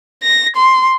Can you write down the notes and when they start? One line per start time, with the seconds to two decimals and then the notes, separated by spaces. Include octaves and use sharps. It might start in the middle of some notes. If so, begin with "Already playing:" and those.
0.23 A#6
0.56 C6